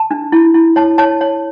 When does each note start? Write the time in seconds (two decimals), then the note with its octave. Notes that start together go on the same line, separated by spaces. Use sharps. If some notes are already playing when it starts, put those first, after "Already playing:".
Already playing: A5
0.11 D4
0.32 E4
0.54 E4
0.76 C#5 A5
0.98 C#5 A5
1.21 C#5